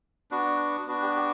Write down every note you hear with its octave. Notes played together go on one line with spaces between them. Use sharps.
B3 D4 F#4
B3 D4 F#4
G4
G4